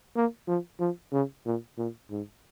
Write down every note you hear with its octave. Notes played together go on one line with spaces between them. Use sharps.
A#3
F3
F3
C#3
A#2
A#2
G#2